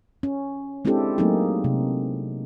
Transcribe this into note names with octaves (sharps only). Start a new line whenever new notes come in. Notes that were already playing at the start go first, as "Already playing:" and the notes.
C#4
G#3 C4 D4 E4 G4 A4
F#3 A3 A#3 C4 D#4 G#4
C3